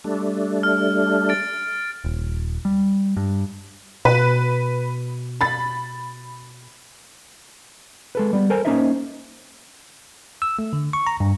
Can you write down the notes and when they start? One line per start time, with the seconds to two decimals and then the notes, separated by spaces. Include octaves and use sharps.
0.04 G3 A3 D4
0.63 F6
1.29 A6 D7
2.04 D#1
2.65 G3
3.17 G2
4.05 B2 B4
5.41 B5 A6
8.15 G#3 A4 B4
8.33 G3 B3
8.50 A4 A#4 C5 G#5
8.65 A#3 C#4 D#4 C5 D#5 E5
10.42 E6
10.59 A3
10.73 D3
10.93 C#6
11.07 A#5
11.20 G2